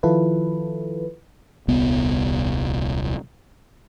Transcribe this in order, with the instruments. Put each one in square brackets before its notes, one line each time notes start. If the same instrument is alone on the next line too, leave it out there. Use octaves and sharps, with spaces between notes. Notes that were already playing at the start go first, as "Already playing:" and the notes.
[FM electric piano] D#3 F3 E4 F4 A4 B4
[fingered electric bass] D#1 C2 B3